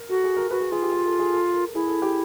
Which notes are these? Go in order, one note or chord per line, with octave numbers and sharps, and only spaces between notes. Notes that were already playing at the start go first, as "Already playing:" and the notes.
Already playing: A#4
F#4 A4
G#4
A#4
F#4 B4
G#4
F4 G#4
G4
G#4
A4
G#4
A4
A#4
E4 G#4
A4
G4